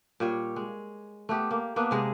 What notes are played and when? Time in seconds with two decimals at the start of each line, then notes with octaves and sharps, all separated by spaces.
0.20 A#2 G3 C#5
0.56 G#3
1.29 A3 B3 G4
1.51 A#3
1.76 A#3 B3 D4 E5
1.91 C3 G#3 G#4